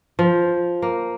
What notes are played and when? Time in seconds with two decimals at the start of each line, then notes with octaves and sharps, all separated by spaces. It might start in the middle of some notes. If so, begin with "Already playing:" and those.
0.19 F3
0.82 A#3